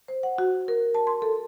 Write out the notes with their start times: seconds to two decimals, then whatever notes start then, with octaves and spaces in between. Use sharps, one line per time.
0.08 C5
0.23 F#5
0.38 F#4
0.68 A#4
0.95 A5
1.07 C6
1.22 A4